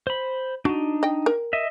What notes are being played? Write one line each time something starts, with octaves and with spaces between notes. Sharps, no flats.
C5 B5
D4 D#4 F#4
D#5 G5
A#4
D#5 E5